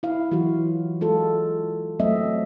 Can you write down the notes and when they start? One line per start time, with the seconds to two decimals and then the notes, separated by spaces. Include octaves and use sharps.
0.03 E4 F5
0.31 E3 F#3 F4 F#4
1.01 G#3 F4 F#4 A4
2.00 F#3 A3 C4 D#5 E5